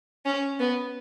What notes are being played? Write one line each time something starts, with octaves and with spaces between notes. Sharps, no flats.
C#4
B3